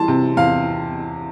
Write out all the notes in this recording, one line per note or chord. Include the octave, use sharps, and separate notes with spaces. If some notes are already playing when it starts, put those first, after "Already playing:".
Already playing: E3 G3 A5 C6
C3
E2 F5